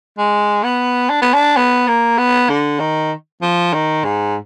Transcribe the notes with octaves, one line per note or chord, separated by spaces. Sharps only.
G#3
B3
D4
B3
D4
B3
A#3
B3
D3
D#3
F3
D#3
G#2